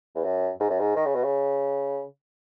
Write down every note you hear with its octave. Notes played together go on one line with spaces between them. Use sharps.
E2
F#2
G#2
F#2
G#2
D#3
C#3
B2
C#3